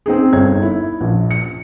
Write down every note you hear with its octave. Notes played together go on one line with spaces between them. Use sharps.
C4 D#4 G#4
G1 D#4 C#5 G#6
E4
A#1
C#7